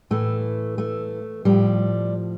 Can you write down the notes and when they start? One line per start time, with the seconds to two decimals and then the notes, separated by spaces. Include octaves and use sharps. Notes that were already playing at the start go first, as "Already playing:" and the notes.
0.11 A2 E3 A3
0.78 A3
1.45 A2 F3 G3